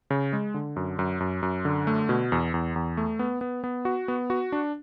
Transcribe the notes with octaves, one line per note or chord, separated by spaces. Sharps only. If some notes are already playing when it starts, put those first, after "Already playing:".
C#3
G#3
D3
F#2
F#2
F#2
F#2
D3
A3
B2
E2
E2
E2
A3
B3
B3
B3
F#4
B3
F#4
D4